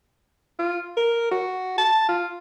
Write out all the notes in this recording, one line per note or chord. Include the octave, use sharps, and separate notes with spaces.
F4
A#4
F#4
A5
F4